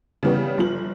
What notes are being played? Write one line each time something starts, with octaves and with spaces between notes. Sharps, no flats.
C#3 E3 G3 B3
G1 F3 F#7